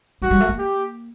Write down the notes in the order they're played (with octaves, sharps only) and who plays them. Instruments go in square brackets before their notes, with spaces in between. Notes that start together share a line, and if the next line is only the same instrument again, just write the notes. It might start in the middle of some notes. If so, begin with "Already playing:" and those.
[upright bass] F#3 [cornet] F#4
[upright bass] G3
A3
A#3
[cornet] G4